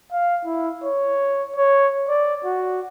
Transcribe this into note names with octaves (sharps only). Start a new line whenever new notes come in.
F5
E4
C#5
C#5
D5
F#4